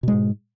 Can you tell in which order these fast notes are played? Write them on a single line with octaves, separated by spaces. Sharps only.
B2 G#3 G#2